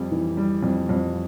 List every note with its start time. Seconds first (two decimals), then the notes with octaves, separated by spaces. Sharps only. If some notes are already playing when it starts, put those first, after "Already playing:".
Already playing: F2 G3
0.11 E3
0.37 G3
0.63 F2
0.89 F2